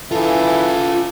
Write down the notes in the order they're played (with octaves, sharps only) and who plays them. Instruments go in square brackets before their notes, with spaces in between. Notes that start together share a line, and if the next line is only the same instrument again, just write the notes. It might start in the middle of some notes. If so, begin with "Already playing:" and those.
[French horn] E3 [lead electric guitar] F4 G#4 [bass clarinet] A4